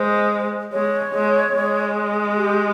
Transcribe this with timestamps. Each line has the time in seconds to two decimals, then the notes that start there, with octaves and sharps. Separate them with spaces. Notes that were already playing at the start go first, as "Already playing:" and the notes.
Already playing: G#3 C5
0.73 G#3 C#5
1.14 G#3
1.55 G#3
2.38 G4